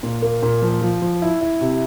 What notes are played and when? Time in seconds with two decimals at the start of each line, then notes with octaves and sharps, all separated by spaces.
0.03 A#2
0.22 A#3
0.43 A#2
0.62 F3
0.82 F3
1.02 F3
1.22 E4
1.41 E4
1.61 C3